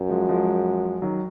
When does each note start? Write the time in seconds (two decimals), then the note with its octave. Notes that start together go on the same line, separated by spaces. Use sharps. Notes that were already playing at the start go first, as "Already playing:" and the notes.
Already playing: F#2
0.09 F3 G#3
0.29 F3 G#3
1.02 D#3 F#3